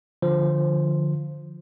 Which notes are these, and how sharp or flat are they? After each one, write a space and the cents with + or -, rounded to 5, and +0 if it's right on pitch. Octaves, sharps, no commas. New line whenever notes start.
D3 +15 F3 -5 C5 +0